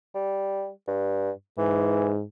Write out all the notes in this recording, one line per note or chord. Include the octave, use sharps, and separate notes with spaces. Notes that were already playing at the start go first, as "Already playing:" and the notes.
G3
G2
G#2 E3